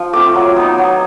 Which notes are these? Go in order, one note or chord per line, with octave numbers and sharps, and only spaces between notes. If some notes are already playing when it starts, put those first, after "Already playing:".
Already playing: F3
A3 C4 F4 D6
F#3
B3 D#4
F#3